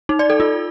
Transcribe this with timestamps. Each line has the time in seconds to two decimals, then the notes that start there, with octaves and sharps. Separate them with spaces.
0.09 D#4
0.19 D5
0.30 A4
0.40 F4